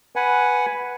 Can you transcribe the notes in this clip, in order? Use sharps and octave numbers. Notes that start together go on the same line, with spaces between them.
B4 F#5 G#5